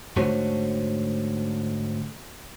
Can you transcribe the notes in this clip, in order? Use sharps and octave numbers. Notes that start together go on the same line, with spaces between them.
G#2 D3 A3 F#4 C5 C#5